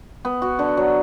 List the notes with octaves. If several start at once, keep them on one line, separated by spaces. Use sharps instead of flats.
B3
F#4
D3
F#3